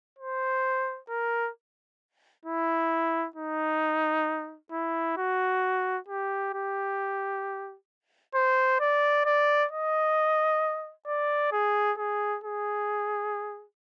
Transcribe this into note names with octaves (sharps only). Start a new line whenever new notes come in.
C5
A#4
E4
D#4
E4
F#4
G4
G4
C5
D5
D5
D#5
D5
G#4
G#4
G#4